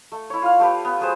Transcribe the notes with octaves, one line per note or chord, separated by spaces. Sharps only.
A3
E4 C#5
F4 F5
A3 G4 B4
B3
F#3 G#4 C5